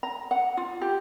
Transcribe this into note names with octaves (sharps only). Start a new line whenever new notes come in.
A#5
F#5
F4
G4